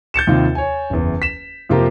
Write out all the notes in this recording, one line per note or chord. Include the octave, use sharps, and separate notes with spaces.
G6 A6 C#7 E7
D#2 C3 D#4 F4
C#5 G#5
F#1 E2
B6 E7
F2 C3 A#3 F4 G4 A#5